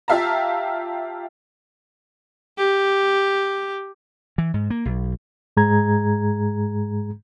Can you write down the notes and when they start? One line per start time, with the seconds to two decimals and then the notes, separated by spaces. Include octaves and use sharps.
0.08 F4 G4 E5 F5 A5 A#5
2.58 G4
4.38 E3
4.54 G#2
4.70 A#3
4.85 B1
5.57 G#2 G#3 G#4 A#5 G#6